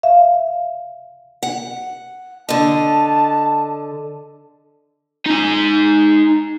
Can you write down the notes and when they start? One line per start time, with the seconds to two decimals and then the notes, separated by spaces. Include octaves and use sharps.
0.03 E5 F5
1.43 F#5
2.49 D3 D#5 A5
5.26 D#4 G#5